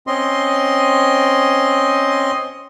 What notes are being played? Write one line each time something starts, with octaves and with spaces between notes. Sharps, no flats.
C4 C#4 D#5 C6